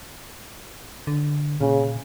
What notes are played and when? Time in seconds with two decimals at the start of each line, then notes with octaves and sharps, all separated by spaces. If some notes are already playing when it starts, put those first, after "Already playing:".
1.07 D3
1.61 A#2 C#3